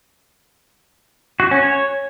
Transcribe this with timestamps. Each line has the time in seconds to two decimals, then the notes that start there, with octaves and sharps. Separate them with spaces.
1.40 F#4
1.51 C#4
1.63 C#5